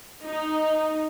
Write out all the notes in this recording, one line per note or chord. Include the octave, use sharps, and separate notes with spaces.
D#4